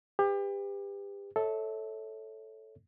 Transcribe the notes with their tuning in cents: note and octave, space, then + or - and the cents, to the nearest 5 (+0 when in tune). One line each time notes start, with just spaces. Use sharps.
G4 +30 B4 +30
A4 +0 C#5 +0 E5 -25